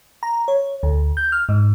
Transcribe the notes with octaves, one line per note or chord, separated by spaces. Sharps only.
A#5
C#5
D2
G6
F6
G#2